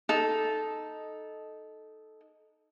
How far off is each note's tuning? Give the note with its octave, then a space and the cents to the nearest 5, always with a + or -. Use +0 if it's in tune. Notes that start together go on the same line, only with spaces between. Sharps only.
D#4 +0 A4 -10